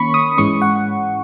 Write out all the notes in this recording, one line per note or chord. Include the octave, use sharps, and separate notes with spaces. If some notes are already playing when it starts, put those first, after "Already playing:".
Already playing: D#3 A#3 C#4 B5 C#6
D#6
G#2 E3 G#3 C#4 C#6
F#5